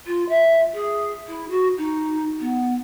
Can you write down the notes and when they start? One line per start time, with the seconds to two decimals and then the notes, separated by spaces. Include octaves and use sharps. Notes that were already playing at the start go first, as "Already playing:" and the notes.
0.07 F4
0.29 E5
0.74 G#4
1.28 E4
1.50 F#4
1.78 D#4
2.40 B3